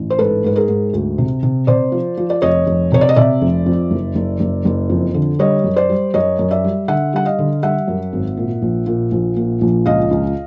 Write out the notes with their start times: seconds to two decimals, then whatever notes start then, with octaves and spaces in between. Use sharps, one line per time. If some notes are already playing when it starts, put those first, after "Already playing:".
Already playing: A1
0.10 C5
0.19 G#2 A4 B4
0.44 G#2 B4
0.56 G#4 A#4
0.69 G#2
0.93 D2
1.18 C3
1.43 C3
1.67 C3 C5 D5
1.92 F3
2.18 F3
2.30 D5
2.42 F1 C#5 D#5
2.67 F1
2.92 C3 C#5
3.01 D5
3.09 D#5
3.16 C3 D5 E5
3.41 F1
3.66 F2
3.91 F#1
4.15 F#1
4.40 F#1
4.65 F#1
4.89 F2
5.14 D3
5.39 G3 C#5 D#5
5.64 F#2
5.76 C5 D5
5.89 G3
6.14 F#2 C#5 D#5
6.39 F#2
6.51 D5 E5
6.64 G3
6.88 D3 E5 F#5
7.13 G3 F#5
7.25 D#5 F5
7.38 D3
7.63 G3 E5 F#5
7.88 F#2
8.13 G#1
8.37 A#2
8.62 A#1
8.87 A#2
9.12 A#1
9.37 A#2
9.61 A#1
9.86 C#2 D#5 F5
10.11 C#2